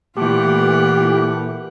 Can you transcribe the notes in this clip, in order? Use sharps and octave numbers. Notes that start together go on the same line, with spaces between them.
A#2 E3 A3 F4 G4 F#5